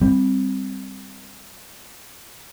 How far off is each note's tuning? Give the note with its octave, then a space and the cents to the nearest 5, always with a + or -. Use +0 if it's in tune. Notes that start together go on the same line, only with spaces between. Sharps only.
G3 +10 C4 +0